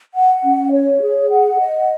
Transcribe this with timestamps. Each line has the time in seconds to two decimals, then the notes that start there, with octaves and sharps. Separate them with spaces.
0.14 F#5
0.44 C#4
0.72 C#5
1.01 G#4
1.30 F#5
1.60 D#5